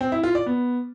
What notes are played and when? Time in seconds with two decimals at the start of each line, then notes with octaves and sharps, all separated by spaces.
0.01 C4
0.12 E4
0.24 F4
0.35 D5
0.46 B3